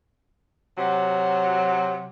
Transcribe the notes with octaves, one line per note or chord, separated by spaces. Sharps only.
C3 F#3